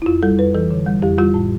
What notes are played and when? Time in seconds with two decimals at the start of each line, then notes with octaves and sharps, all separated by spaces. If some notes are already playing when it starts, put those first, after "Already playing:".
0.02 E4
0.06 F2 F4
0.23 G3 A4
0.39 F2 B4
0.55 E3 A4
0.71 D3
0.87 G3
1.02 F2 G4
1.18 G3 F4
1.34 A2